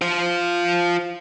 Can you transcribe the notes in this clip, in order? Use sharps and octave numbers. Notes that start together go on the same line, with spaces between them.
F4 C5